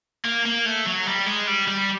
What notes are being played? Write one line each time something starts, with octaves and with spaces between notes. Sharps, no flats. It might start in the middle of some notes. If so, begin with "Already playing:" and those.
A#3
A#3
A3
F#3
G3
G#3
G3
G3